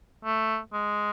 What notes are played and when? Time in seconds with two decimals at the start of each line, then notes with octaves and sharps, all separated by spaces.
0.24 A3
0.73 G#3